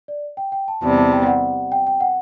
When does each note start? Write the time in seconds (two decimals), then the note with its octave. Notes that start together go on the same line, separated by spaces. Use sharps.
0.08 D5
0.37 G5
0.52 G5
0.68 A5
0.82 E2 C3 G3 A5
0.97 A5
1.12 G5
1.27 F#5
1.72 G5
1.87 G5
2.01 F#5